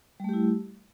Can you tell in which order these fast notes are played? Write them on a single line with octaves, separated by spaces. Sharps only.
G3 A3 G4 E4